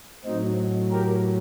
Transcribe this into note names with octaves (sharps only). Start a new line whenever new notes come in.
A2 F#3 C4 D#4
G4 A#4